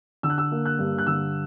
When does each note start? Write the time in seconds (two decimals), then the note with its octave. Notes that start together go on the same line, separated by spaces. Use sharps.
0.23 D3 E6
0.30 F#6
0.38 E6
0.51 A#3
0.65 F#6
0.79 G2
0.98 F#6
1.07 D3 E6